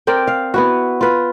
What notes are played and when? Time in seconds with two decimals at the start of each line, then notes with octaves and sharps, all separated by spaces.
0.07 C4 A#4 D5 G5
0.27 F5
0.54 B3 E4 F#4
1.01 F4 B4